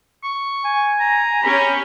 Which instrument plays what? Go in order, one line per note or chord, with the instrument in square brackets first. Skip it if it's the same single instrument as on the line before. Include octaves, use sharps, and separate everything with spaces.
[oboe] C#6
[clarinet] G#5
[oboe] A#5
[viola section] C#4 G4 [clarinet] B5